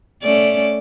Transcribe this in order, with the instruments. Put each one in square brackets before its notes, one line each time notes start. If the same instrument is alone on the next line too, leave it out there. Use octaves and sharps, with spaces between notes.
[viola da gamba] A3 C#4 D5